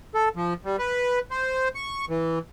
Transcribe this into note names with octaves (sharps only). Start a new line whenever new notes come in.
A4
F3
G3
B4
C5
C#6
E3